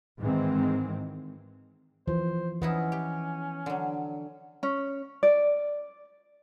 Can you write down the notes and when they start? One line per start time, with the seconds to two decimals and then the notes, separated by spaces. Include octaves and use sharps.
0.19 G#2 D#3 E3 G#3 C4
2.08 E3 F3 C5
2.62 E3 B3 C#4 D#4 E4
2.92 G4
3.66 D3 F#3
4.63 C#4
5.23 D5